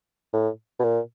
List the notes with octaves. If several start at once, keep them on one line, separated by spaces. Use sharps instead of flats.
A2
B2
A#2